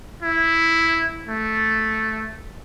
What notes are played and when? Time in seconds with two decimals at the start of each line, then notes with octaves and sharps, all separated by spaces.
0.22 E4
1.27 A3